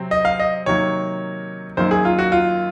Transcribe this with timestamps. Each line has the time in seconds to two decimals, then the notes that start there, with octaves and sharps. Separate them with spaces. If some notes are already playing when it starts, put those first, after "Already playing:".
Already playing: C3 F#3 C4
0.11 D#5
0.25 F5
0.40 D#5
0.66 C3 D#3 F#3 A#3 C#5
1.77 F#2 D#3 F#3 A#3 C5
1.91 G#4
2.05 F4
2.19 F#4
2.32 F4